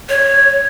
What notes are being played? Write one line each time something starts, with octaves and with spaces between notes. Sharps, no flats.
C#5